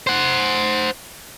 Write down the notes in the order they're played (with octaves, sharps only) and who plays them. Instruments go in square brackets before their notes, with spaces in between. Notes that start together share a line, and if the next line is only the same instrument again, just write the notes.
[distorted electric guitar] C5 F#5